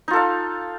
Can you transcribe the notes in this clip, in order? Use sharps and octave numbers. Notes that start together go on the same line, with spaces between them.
D#4 F4 A4 F5